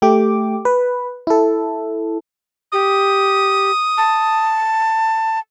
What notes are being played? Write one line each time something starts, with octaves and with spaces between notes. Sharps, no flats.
A3 G4 D6
B4
E4 A4
G4 D#6
A5